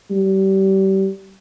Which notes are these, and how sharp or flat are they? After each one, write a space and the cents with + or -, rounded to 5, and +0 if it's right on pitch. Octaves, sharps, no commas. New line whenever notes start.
G3 -30